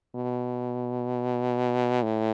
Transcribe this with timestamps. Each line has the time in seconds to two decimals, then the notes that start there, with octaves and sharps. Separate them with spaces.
0.15 B2
2.03 A2